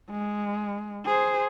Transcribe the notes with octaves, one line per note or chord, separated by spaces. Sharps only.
G#3
G#4 C5